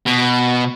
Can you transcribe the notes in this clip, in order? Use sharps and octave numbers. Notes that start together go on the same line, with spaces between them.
B2